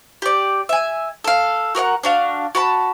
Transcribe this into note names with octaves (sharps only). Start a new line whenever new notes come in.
G4 D5
E5 G#5
A4 F5
F#4 A#4 D5 F#5
D4 F#4 F5
F#4 A5 B5